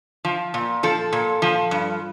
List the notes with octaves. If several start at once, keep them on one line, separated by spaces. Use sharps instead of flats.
F3
A#2
F3 A4
A#2
F3
G2